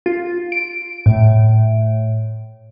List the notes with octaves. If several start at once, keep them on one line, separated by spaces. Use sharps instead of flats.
F4
D7
A2